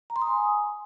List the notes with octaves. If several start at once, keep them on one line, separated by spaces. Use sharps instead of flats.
A#5
C6
D#6
G#5